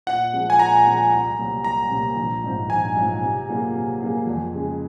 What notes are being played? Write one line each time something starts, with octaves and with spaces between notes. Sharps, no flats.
A#2 F#5
F3 G#3 C4
G#5
A#2 A#5
F3 G#3 C4
C2
C3 F#3 A#3
C2 A#5
C3 F#3 A#3
A#1
G#2 F#3 C4 F4
A#1 G#5
G#2 F#3 C4 F4
C3
F#3 A#3 F4 G#4
C3
F#3 A#3 F4 G#4
F2
C#3 G#3